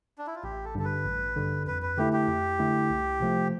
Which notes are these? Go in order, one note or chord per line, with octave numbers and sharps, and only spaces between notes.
D4
E4
F4
A1 G4
A4
G2 D3 A4
B4
A1
G2 D3
F2 B4
B4
D3 A3 E4 G4
G4
F2
D3 A3 E4
C2
C3 F3 A3